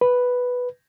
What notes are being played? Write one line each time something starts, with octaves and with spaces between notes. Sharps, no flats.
B4